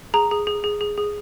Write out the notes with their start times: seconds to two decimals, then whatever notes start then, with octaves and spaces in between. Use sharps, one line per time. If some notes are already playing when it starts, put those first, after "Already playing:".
0.14 G#4 A#5
0.31 G#4
0.47 G#4
0.64 G#4
0.81 G#4
0.98 G#4